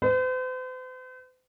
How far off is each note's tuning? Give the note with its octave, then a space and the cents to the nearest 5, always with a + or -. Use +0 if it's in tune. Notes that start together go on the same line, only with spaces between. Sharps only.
C5 -45